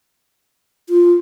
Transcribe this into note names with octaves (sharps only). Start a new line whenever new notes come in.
F4